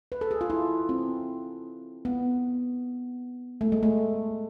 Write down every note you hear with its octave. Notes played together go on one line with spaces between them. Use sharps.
B4
A4
G#4
F4
E4
C4
B3
A3
G#3
A3